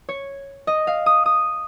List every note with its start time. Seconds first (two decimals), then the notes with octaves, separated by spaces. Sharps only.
0.09 C#5
0.67 D#5
0.87 F5
1.06 D#6
1.26 D#6